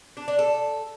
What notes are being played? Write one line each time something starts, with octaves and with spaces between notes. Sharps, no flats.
D4
D4
A4